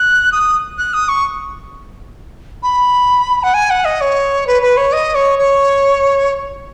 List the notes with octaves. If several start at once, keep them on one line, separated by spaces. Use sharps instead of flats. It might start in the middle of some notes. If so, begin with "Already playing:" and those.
Already playing: F#6
D#6
F#6
D#6
C#6
B5
F#5
G#5
F#5
D#5
C#5
B4
B4
C#5
D#5
C#5
C#5